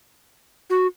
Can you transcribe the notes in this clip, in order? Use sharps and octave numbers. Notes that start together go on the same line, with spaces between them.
F#4